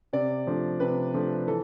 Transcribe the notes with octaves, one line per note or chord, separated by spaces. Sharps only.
C3 D5
F3 A3 D4
C3 B4
F3 A3 D4
E3 A4